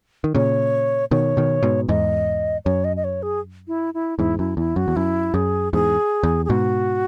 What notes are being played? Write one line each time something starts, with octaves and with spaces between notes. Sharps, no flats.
D#3
A#2 C#3 C#5
B2 D#3 C#5
B2 D#3
G#2 B2
E2 G#2 D#5
F#2 C#5
D#5
D#5
C#5
G#4
E4
E4
E2 G#2 E4
F#2 E4
E2 E4
F#2 F#4
E2
F#2 E4
F#2 G#4
E2 G#2 G#4
E2
G#4
G#2 B2 F#4